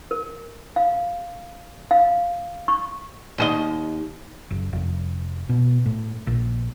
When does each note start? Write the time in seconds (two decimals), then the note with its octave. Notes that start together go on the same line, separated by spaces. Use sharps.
0.11 A#4
0.76 F5
1.91 F5
2.68 C#6
3.38 D#2 G#4 D#5
4.50 F#1
4.73 F1
5.49 B2
5.86 A2
6.27 A#1